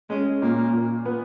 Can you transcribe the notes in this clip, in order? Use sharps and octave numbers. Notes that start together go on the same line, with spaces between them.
G#3 C#4
A#2 A#3
A#2
B3